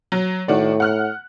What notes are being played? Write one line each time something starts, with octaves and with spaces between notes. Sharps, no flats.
F#3
A2 D#3 F#4 D5
F#5 F6 F#6